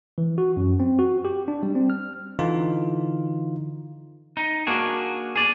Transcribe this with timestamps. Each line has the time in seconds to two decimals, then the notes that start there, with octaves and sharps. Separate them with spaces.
0.18 E3
0.38 F#4
0.57 F#2
0.80 C4
0.99 F#4
1.25 G4
1.48 D4
1.63 G3
1.75 C4
1.90 F6
2.39 D3 E3 D#4 F4
4.37 D#4
4.67 A#3 D4 F#4 G#4
5.36 G#4 D5